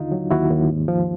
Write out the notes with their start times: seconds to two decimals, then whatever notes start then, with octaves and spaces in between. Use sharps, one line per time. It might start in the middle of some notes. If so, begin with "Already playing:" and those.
Already playing: D#2 D3 D#4 F4
0.12 F#3
0.31 D#2 E4 F#4
0.51 D#2
0.70 G#2
0.88 F3